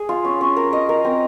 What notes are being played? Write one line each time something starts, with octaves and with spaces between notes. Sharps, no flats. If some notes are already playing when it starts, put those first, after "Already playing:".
Already playing: G#4
F4
C#4
C#4
A#4
D#5
A#4
C4